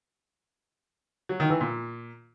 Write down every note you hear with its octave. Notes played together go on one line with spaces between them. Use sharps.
F#3
D#3
E3
A#2